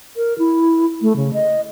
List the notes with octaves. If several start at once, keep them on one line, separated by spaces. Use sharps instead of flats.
A#4
E4
A3
C#3
D#5